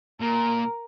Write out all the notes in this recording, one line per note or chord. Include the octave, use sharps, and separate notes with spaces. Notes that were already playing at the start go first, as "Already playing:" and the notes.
A#2 A#4